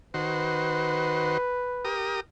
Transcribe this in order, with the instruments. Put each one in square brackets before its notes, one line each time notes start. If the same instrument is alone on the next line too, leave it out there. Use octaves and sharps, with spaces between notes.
[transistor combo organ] D#3 F#4 C5 [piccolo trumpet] B4
[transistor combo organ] G4 A#4 D#6